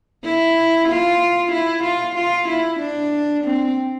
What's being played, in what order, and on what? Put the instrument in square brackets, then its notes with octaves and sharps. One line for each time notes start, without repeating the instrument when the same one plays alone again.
[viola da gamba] E4
F4
E4
F4
F4
E4
D4
C4